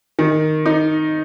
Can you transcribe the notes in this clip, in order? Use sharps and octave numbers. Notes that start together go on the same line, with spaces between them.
D#3
D#4